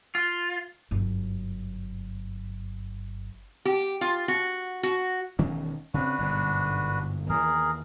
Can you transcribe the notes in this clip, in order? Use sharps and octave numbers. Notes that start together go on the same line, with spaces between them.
F4
G1 F#2
G4
F4
F#4
F#4
E1 D#3 C#4
C#3 C4 D4 F#4 B4
G1 G#2 B2
D#2 E3 G#4 A#4